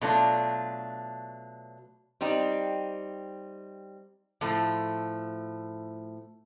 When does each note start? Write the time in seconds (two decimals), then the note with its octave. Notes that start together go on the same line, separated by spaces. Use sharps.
0.01 B2 F#3 A3 D4 F4
2.21 G3 C4 D#4
4.41 A2 F3 A3